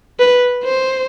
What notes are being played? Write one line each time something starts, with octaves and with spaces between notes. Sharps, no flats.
B4
C5